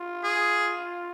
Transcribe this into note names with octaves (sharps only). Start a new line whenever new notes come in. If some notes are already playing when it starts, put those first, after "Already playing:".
Already playing: F4
G#4